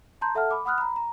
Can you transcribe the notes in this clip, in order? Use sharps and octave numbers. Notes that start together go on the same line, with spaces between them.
A5 A#5 C6 G6
A4 E5 F#5 A5 F6
B5 D6
F#5 B5 D#6 F6 F#6
A#5 B5
A#5